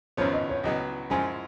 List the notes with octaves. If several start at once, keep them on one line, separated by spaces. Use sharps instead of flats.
G#1 F#2 C#3 F3 B3 C#5
D#5
C#5
C#2 C#3 F#3 B3 D#5
F#2 F3 G#3 G#5